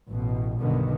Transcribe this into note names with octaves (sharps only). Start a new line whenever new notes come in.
A1 B2
B1 G2 B2 D3 D#3 B3